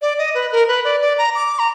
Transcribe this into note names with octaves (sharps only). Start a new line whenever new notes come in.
D5
D#5
B4
A#4
B4
D5
D5
A#5
D6
A#5